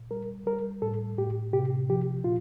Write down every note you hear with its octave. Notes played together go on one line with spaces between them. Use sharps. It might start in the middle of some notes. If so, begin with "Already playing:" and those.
Already playing: A#2
G3 A#4
G3 A#4
A2 A4
A2 G4
C3 G4
F3 G4
A#2 F4